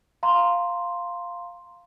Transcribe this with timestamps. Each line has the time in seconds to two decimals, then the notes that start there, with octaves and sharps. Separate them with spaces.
0.23 F5 A#5 C6